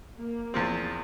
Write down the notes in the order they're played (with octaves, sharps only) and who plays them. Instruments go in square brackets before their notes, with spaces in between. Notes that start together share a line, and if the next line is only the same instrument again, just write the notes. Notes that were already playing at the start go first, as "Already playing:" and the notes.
[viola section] A#3
[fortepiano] E2 F3 C4